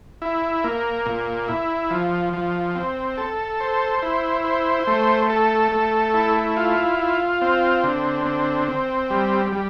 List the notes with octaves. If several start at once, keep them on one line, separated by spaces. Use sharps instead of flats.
E4
A#3
A#2
E4
F3
F3
C4
A4
C5
E4
C5
A3
A4
A3
E4
F4
F4
C4
D3
C4
C4
G3
G3